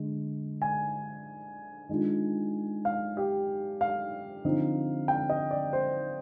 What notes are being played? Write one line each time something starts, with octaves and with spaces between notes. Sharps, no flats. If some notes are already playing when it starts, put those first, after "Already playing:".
Already playing: D3 G#3
G#5
D#3 G#3 D4 F4
F5
G4
F5
D3 F3 C4 D#4
G5
D#5
D5
C5